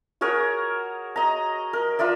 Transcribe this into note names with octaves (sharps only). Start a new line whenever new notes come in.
F#4 G#4 A#4 C#5
D#5 A#5
A#4
F4 A#4 D5 E5